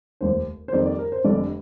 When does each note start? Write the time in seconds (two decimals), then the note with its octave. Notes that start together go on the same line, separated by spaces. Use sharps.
0.21 F1 D#2 D#3 C5
0.68 C5
0.73 F2 D#3 G3 A#3 D5
0.86 D5
0.99 A#4
1.12 C5
1.24 F1 F2 D3 G3 D5